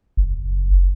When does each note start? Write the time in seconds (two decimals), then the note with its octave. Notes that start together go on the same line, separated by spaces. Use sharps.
0.17 F#1